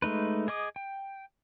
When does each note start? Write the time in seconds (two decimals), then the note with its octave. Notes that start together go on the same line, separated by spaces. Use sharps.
0.02 G#3 A3 D#4 B4
0.48 G#4 D#5 D6 D#6
0.76 G5